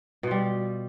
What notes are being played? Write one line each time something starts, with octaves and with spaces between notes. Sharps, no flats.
B2 G3 F4